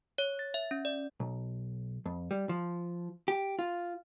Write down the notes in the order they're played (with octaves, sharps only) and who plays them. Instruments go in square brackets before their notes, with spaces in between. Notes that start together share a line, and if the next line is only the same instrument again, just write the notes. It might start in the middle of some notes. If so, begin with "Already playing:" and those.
[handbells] C#5
A6
E5
C#4
D5
[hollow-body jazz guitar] B1
F2
G3
F3
G4
F4